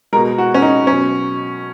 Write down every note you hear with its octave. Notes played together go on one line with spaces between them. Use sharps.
B2 G#3 A#4
F#4
C#4
D#4
B2 F#3 C#4